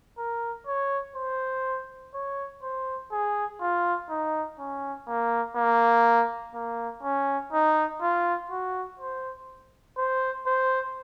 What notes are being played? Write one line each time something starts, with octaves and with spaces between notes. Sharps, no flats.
A#4
C#5
C5
C#5
C5
G#4
F4
D#4
C#4
A#3
A#3
A#3
C#4
D#4
F4
F#4
C5
C5
C5